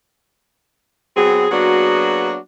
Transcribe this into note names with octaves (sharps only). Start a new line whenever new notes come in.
F#3 B3 C4 G#4
F#3 A#3 B3 D4 F#4 G#4